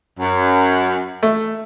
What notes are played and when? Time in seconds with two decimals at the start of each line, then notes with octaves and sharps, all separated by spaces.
0.19 F#2
1.23 A3